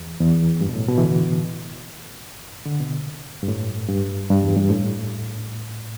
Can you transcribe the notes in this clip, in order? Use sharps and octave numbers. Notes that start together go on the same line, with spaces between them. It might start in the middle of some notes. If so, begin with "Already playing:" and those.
Already playing: E2
E2
G2
B2
A2
B2
E3
D3
D3
B2
G2
A2
G2
G2
E2
G2
A2